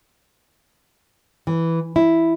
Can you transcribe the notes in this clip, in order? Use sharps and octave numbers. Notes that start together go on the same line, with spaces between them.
E3
E4